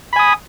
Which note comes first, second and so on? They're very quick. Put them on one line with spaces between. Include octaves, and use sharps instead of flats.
B5 G#5 D#6